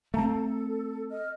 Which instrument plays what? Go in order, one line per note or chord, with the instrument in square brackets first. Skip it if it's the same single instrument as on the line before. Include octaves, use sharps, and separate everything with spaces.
[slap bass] A3 C4 [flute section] F5 A5 A#5
[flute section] A4
D#5 F6